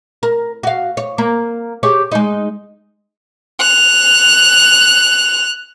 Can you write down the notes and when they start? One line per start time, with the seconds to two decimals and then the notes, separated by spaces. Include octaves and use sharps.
0.23 A#4
0.63 F#4 F5
0.97 C#5
1.18 A#3
1.83 G4 G#4 C#5
2.12 G#3 D#4
3.60 F#6 F7